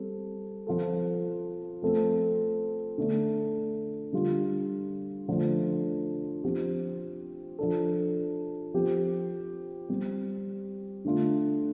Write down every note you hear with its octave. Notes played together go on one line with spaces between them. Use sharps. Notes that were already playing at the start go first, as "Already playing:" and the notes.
Already playing: G3 C4 A4
F3 C4 F4 A4
F3 A3 C4 A4
D3 A3 D4
D3 G3 F4
D3 F3 A3 D4
F3 C4 G4
F3 D4 A4
F3 C4 G4
G3 C4 G4
D3 A3 D4 F4